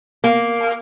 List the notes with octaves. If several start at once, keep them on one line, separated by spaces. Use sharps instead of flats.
A#3